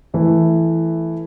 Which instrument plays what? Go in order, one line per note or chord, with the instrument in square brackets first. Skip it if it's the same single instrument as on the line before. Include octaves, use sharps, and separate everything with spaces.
[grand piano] E3 A3 E4